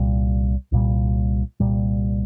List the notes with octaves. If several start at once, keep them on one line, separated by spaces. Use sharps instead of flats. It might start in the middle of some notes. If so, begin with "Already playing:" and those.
Already playing: C2 A#2 G3
C2 A#2 G3
C2 A#2 G3